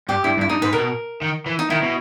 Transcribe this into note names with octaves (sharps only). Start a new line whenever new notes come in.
G2 G4
G2 E4
G2
E4
G2 D#4
G#2 B4
B2 A#4
D#3
E3
D#4
D#3 E4
B2